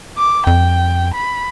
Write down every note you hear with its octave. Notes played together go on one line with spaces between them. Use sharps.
D6
F2 G5
B5